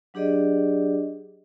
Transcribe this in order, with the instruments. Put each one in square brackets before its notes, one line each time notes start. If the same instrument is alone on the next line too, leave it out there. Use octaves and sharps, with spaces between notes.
[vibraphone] F#3 D4 G4 G#4 D5 D#5